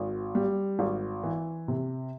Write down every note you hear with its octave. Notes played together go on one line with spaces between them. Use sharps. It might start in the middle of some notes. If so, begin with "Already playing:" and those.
Already playing: G#1
G3
G#1
E3
C3